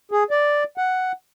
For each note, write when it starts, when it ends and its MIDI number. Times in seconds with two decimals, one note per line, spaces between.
0.12 0.23 68
0.31 0.64 74
0.78 1.12 78